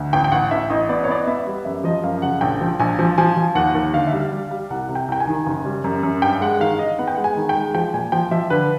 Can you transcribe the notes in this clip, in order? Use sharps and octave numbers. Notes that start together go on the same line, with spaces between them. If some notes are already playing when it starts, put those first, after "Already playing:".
Already playing: D2
A1 G5
G5
A1 F#5
A1 E5
A1 D#5
B3 D5
C#5
B3 D5
D#5
B3 E5
G3
F#2 E5
F3 D#5
F#2 F5
C#3 F#5
A#1 G5
F3
A#1 G#5
F3
F3 G#5
F3
D#2 F#5
D#2
D3 F5
E5
G3
F5
G3
G3
C2 F#5
C3
G5
C2 G5
G#5
D#3
F#1
G3
F#2
F#2
G2 G5
G#3 F#5
D#3 F5
D#3 D#5
B3 F#5
G5
G#3 F#5
G#5
D#3
G5
G#3
F3 G5
A#2 G#5
F3 G5
F3 E5
D3 B4